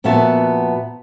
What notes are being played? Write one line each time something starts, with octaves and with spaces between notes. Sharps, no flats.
F2 A#2 B3 F#4 E5 A5